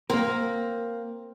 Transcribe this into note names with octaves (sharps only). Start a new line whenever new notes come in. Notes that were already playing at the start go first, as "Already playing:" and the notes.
A#3 C4 A#4